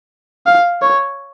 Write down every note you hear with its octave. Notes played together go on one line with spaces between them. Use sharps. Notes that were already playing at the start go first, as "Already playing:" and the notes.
F5
C#5